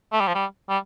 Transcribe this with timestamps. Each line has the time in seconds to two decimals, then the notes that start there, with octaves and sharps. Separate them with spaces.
0.13 A3
0.20 G3
0.27 F3
0.35 G3
0.69 G3